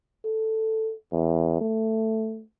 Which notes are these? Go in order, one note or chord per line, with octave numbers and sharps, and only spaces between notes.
A4
E2
A3